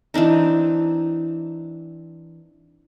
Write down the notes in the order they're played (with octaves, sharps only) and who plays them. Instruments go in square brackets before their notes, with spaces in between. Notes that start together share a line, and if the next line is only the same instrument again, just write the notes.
[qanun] E3 C4 D4 D#4